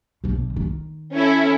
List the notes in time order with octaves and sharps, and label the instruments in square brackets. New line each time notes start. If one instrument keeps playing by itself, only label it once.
[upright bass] B1 D3
D#3
[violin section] C#4 E4 A4